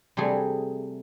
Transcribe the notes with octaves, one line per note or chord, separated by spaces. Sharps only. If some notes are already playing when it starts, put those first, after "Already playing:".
C3 G3 A3 G#4